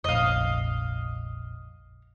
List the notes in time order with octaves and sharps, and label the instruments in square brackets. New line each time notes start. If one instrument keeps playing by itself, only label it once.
[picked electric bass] F1 A#1 [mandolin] D#5 F5